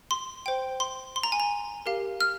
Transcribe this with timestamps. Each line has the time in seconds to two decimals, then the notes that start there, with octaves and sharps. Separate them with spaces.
0.11 C6
0.46 C5 G5
0.80 C6
1.16 C6
1.23 A#5
1.32 G#5
1.40 A#5
1.86 G4 A#4 F5
2.20 F6